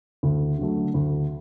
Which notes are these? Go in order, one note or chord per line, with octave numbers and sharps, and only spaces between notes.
D2
D3 F#3 A3
D2